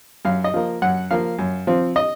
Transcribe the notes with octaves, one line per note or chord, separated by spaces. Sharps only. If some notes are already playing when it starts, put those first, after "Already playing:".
F#2 F5
D#5
F3 A#3
F#2 F#5
F3 A#3 F5
F#2
F3 C4
D#5